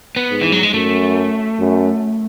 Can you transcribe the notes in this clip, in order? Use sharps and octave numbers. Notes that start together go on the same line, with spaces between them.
B3
G#2
E3
F#3
G#3
F#2 A3
F#2